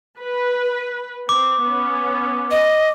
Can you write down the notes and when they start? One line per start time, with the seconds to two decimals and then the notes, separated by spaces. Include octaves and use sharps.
0.20 B4
1.29 C4 D6
1.63 B3 C#4
2.51 D#5